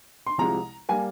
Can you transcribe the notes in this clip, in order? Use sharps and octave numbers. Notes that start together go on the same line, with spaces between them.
C6
C2 C3 F3 G#3 A#5
G3 A#3 G#5